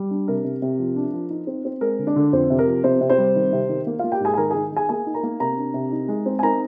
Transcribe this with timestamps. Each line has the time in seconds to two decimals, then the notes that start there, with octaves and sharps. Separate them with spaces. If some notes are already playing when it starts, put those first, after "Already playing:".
Already playing: G3
0.11 D4
0.28 C3 A#4
0.44 C3
0.62 C3
0.79 F3
0.96 D4
1.13 F3
1.30 D#4
1.47 C4
1.65 C4
1.81 G#3 A#4
1.99 D3
2.07 D4 D5
2.16 D3
2.33 F2 C4 C5
2.50 C3
2.59 A#4
2.67 F3
2.84 C3 C4 C5
3.01 C3
3.10 C4 C5
3.18 G3
3.36 D#3
3.53 C3
3.69 D#3
3.87 A#3
3.99 A#3 F4 F5
4.12 G4 G5
4.20 G#2 G#4 G#5
4.34 G#5
4.37 D#3 A#4 A#5
4.50 D#3 G#4 G#5
4.72 D#3 G#4 G#5
4.89 A#3 G#4 G#5
5.07 D#4
5.14 A#4 A#5
5.23 A#3
5.40 C3 A#4 A#5
5.58 D4
5.74 C3
5.92 D#4
6.08 G#3
6.26 C4
6.39 G#5
6.43 D#4 A#4 A#5